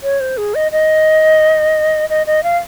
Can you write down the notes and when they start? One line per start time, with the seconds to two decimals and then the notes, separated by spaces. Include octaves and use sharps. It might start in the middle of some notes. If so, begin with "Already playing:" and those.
0.03 C#5
0.20 C5
0.37 G#4
0.55 D#5
0.72 D#5
2.10 D#5
2.27 D#5
2.43 F5